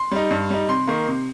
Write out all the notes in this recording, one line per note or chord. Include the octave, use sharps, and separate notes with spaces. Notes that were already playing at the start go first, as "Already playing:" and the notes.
Already playing: C6
G3 D#4
G2
G3 D#4
C3 C6
D#3 A#3
C3